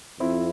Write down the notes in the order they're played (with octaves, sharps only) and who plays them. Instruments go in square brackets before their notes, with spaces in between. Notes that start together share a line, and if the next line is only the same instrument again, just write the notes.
[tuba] F2 [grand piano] C4 E4